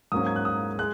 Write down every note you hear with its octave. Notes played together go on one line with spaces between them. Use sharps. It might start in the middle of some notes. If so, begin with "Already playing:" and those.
G#2 F#3 A#3 C#4 D#6
G#6
F#6
D#6
G#3 F#6